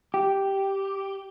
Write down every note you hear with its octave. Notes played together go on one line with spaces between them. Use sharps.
G4